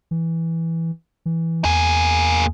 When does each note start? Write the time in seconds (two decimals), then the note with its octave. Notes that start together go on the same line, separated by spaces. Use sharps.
0.11 E3
1.26 E3
1.65 E2 A#3 G#4